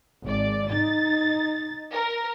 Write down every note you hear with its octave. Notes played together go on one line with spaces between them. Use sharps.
G#1 D5
D#4 A6
A#4